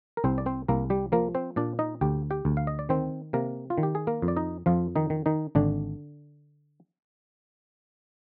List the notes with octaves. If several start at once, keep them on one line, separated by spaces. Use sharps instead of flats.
A#4
C2 C4 C5
D5
C4 C5
C2 A#3 A#4
G3 G4
F3 A#3 A#4
C4 C5
A#2 D4 D5
D#4 D#5
D2 G4 G5
G4 G5
D2
F5
D#5
D5
D#3 C4 C5
C3 A#3 A#4
F4
D#3
G4
G#4
A#3 A#4
F2
D5
D#4 D#5
F2 F3 F4
D#3 D#4
D#3
D#3 D#4
G#1 D3 D4